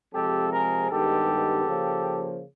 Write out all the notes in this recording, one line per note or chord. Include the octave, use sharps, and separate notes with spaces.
C3 F3 G#3 C4 G4 A4
G#4 A#4
G2 D#3 G#3 B3 G4 A4
C#3 F3 A#3